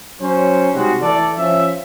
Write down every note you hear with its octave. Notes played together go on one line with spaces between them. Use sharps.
F#3 C#4 C5
C3 G3 G#3 D#4 F#4
E3 A3 A4 D5
F3 C#4 E5